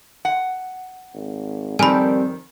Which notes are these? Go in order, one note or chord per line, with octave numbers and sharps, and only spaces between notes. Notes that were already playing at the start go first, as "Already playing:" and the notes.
F#5
G#1
F2 D#3 G3 C4 A4 A#4 G#5 B5